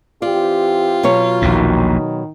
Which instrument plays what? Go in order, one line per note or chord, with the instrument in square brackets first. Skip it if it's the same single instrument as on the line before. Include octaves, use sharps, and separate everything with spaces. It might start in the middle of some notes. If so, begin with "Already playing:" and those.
[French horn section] E3 C4 G4 [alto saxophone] F4 [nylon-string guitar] D5
[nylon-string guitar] B2 F#3 C#5
[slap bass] A#1 D#2 A#2 [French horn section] D#3